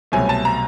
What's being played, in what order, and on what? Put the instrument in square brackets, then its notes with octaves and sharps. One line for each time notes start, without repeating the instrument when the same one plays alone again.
[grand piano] C2 B2 F#3 A3 G#5
A5
A#5